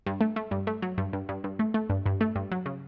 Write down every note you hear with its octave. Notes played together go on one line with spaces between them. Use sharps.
G2
A3
A3
G2
A3
F#3
G2
G2
G2
G2
A3
A3
G2
G2
A3
G2
F#3
C#3